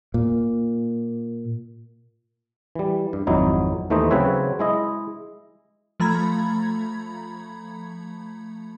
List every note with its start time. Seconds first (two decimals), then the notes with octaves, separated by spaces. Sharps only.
0.14 A#2
2.75 E3 G3
3.13 G2
3.27 G#1 F2 F#3 D#4 E4
3.90 D#2 E3 A3 D#4 C5 D#5
4.11 C#3 F#3 C4 B4 C#5 E5
4.59 G#3 E4 D#5
6.00 F3 A3 A#5 B5 G#6